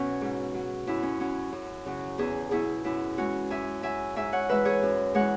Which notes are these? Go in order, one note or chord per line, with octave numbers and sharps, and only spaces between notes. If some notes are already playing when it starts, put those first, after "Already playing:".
Already playing: B2 F#3 C#4 F#4
G#2
F#3
F#2 E4
C#4
F#3 C#4
F#2
C#3 F#3
E2 E4 G#4
B2 F#3 E4 G#4
F#2 E4
E3 G#3 C#4 F#4
F#2 E5 G#5
F#3 E5 G#5
G#2 E5 G#5
C#5 F#5
E3 G#3 B4 E5
G#4 C#5
F#2
E3 G#3 C#5 F#5